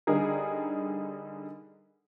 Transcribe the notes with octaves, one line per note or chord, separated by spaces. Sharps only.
D3 G3 D#4 G#4 A#4